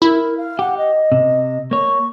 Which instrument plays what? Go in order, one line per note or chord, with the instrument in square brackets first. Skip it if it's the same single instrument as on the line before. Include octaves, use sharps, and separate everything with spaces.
[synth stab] E4 [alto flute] A#4
[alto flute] F5
[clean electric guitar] G4 [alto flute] F#5
[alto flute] D#5
[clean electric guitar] C3
[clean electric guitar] A#3 C#5 [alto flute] C#6